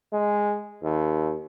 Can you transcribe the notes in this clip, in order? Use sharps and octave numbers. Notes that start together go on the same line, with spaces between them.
G#3
D#2